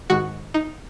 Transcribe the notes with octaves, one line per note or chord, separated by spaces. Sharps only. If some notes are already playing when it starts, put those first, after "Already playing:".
G#2 D#3 G#3 F#4
D#4